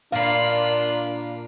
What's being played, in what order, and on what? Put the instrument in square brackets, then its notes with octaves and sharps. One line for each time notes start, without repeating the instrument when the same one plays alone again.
[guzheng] A#2 A#3 [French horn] D4 [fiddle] F4 B5 [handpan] F5